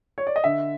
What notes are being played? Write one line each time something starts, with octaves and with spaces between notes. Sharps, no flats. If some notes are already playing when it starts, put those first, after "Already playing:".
C#5
D5
D#5
D3 E5